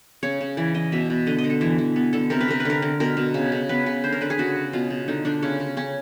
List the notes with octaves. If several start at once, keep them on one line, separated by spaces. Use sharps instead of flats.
C#3 C#5
C#3
E3 D5
E3 D#5
B2 E5
B2
D3 D#5
D#5
D3
A4
E3
E3
B3
D3 A4
C3 A#4
B4
C3 A#4
B4
D3 A#4
D3
B2 A#4
B2
C#3
C#3
B3 B4
C#3 B4
D3 C5
A#4
D3 B4
G#4
C#3 F#4
C#3
B2 F4
B2
D3 D#4
D3 D4
C#3 C#4
C#3
C#3 C#4